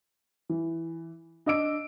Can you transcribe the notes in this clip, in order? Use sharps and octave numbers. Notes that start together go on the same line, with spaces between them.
E3
D4 D#5 D6 E6 D7